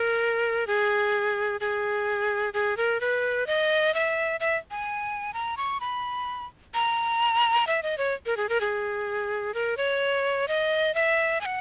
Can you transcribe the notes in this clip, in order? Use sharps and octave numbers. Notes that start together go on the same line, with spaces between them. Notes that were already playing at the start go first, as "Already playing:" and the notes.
Already playing: A#4
G#4
G#4
G#4
A#4
B4
D#5
E5
E5
G#5
A#5
C#6
B5
A#5
E5
D#5
C#5
A#4
G#4
A#4
G#4
A#4
C#5
D#5
E5
G#5
F#5